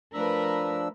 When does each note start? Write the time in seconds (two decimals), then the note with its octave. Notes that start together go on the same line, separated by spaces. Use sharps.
0.14 F3 A3 D4 A#4 B4 E6